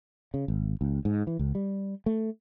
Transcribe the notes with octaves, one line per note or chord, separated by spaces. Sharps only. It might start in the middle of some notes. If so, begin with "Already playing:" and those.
C#3
G#1
C#2
G#2
E3
C#2
G3
A3